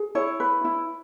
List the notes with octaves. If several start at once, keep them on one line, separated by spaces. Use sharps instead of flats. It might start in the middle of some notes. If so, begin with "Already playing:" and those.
Already playing: G#4
E4 C#5
B4
E4